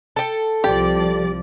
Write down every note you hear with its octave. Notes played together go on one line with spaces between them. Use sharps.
A4 G5
C2 F3 G4 D5